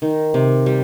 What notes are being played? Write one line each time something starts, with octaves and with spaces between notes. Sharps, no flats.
D#3
C3
G3